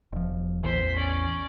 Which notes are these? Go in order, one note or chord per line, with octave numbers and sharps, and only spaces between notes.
E1 F3
A1 E2 E3 C5 B6
C#4 D5